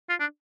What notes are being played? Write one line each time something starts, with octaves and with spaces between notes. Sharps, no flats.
F4
D4